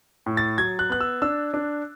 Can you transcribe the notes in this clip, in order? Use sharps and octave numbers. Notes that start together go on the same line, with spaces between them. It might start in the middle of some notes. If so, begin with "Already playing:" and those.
A2
A6
F#3 G#6
F#6
B3 F#6
E6
D4 E6
D4